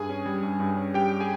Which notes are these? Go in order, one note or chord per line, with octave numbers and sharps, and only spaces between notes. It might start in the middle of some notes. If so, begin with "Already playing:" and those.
Already playing: G2 G#4 G#5
C#4
G3
G2
G2
C#4
G3 G4 G5
G#4 G#5